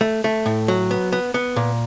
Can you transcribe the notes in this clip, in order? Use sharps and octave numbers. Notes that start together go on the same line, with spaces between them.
A3
A3
A2
F#3
B3
B3
B3
A#2